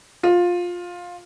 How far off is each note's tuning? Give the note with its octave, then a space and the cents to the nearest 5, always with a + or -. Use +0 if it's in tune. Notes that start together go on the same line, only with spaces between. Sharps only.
F4 +15